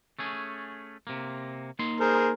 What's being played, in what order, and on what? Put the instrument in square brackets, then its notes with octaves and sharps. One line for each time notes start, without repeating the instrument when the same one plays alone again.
[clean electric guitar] A3 C#4 G#4
C3 A#3
A#3 D#4 C6
[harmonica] G#4 A#4 C5